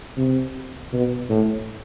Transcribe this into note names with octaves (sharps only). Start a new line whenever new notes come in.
C3
B2
A2